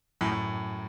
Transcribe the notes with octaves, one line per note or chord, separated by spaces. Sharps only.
F#2 A2
A2